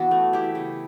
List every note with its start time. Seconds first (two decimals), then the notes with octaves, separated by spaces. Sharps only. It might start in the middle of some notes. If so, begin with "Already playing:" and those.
Already playing: E3 B3 F#4
0.11 A3
0.33 E4 G4
0.55 C#3